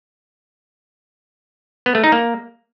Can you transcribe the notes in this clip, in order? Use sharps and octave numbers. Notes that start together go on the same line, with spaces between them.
B3
A3
D#4
A#3